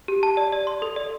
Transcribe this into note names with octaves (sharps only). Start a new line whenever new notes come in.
G4
A5
D5
D5
C6
A4
D5